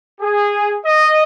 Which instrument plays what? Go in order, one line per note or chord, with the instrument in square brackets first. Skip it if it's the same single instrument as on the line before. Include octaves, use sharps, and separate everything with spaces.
[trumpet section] G#4
D#5